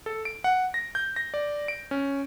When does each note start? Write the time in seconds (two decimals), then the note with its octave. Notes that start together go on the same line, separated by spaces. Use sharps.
0.06 A4
0.25 D7
0.44 F#5
0.74 A#6
0.95 G6
1.16 A#6
1.34 D5
1.68 D7
1.91 C#4